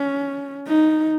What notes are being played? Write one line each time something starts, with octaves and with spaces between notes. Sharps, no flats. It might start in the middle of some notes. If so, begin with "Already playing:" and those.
Already playing: C#4
D#4